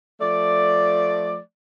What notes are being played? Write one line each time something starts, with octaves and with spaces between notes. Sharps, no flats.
F3 A3 D5